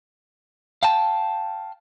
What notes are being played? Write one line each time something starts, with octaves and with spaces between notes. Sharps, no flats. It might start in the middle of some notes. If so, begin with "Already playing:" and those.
F5 G5 A5